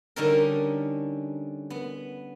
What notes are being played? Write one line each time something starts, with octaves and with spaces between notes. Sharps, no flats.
D3 G3 C#4 D#4 A4 A#4
B3